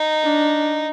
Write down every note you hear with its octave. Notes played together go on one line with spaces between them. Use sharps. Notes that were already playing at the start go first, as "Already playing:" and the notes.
Already playing: D#4
D4